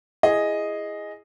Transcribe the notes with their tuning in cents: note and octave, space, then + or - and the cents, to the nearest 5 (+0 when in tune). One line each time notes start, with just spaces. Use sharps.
E4 +20 G#4 +0 D#5 +0